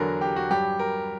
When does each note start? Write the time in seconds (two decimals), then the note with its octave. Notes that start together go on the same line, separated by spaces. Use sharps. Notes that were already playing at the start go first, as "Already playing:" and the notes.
Already playing: E2 D3 F#3 A#4
0.21 G4
0.36 F#4
0.50 G2 F#3 G4
0.79 A#4